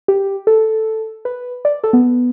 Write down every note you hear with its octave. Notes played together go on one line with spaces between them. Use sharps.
G4
A4
B4
D5
A4
B3